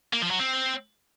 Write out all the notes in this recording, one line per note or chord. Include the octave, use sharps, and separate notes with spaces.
A#3
F3
F#3
C4